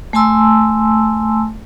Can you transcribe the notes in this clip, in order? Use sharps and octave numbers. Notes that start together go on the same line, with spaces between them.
A3 G#5 A5 C6 E6